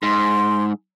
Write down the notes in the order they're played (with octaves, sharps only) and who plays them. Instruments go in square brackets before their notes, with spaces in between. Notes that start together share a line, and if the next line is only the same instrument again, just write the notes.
[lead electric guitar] G#2 [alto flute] C6